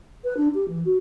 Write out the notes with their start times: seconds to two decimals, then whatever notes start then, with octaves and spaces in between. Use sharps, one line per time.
0.24 B4
0.36 D4
0.54 G4
0.68 E3
0.85 F#4